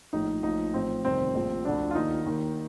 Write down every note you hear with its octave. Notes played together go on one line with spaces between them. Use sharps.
A#1 A2 F3 D#4
A#1 A2 F3 D#4
A1 A2 F3 C4
G1 F2 C3 D#3 C4
A#1 A2 F3
D2 D3 F3 D4
F4
D#2 D#3 D#4
D#2 D#3